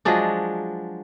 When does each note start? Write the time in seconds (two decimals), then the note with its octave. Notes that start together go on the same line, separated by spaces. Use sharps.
0.05 F3 F#3 G#3 D4